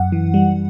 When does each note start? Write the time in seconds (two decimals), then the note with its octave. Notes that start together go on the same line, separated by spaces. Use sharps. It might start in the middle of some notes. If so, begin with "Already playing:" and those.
Already playing: F#2 F#5
0.12 E3
0.34 G3